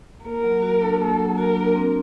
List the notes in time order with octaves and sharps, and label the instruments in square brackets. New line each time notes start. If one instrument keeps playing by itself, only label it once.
[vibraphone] A#3 [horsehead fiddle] A#4
[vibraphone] F#3
F#4
D4
[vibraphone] A#3 [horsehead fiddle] A4
[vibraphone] F#3
[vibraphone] F#4 [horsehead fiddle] A#4
[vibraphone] D4
C4